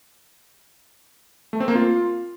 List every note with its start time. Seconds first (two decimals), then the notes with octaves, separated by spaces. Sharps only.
1.53 A3
1.60 C4
1.68 A#3
1.75 F4